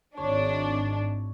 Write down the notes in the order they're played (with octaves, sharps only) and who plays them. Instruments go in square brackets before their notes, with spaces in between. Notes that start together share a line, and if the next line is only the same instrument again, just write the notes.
[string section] G#1 D4 [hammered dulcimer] C#5